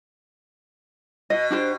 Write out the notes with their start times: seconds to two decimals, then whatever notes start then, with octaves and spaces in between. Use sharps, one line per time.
1.30 B2 D#5
1.50 D4 G4 C5